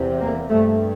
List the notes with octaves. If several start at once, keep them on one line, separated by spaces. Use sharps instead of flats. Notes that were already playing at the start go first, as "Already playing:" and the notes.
Already playing: E2 C3
A#3
G2 A3